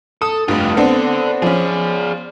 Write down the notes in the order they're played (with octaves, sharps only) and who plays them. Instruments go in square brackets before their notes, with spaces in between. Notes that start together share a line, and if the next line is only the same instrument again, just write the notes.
[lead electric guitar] A4 [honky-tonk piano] D#6
[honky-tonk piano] F1 G2 [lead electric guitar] F4 G4
[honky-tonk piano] B3 C4 D4 [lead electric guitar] A4 D5
[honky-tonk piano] F3 C#4 [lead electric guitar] G#4 D5